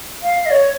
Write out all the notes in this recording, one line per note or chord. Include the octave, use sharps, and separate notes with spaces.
F5
D#5
C#5